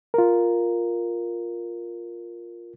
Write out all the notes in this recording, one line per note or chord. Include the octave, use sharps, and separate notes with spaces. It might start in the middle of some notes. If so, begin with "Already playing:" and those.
F4 A#4